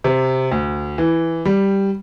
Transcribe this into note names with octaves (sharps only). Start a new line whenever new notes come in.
C3
D2
E3
G3